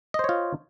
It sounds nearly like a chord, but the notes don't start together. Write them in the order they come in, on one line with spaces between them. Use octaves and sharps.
D#5 C5 C#5 F4